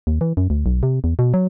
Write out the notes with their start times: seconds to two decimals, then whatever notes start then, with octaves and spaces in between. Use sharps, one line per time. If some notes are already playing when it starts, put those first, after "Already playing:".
0.07 D#2
0.21 E3
0.37 F#2
0.50 D2
0.66 B1
0.83 C3
1.04 E2
1.19 B2
1.34 F#3